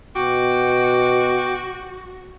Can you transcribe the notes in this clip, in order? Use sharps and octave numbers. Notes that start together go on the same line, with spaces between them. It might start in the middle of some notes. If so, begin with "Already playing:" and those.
B2 F#4 G5 D6